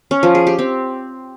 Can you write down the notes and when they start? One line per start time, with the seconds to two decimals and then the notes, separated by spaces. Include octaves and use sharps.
0.11 C#4
0.23 F3
0.35 G#4
0.47 G4
0.59 C4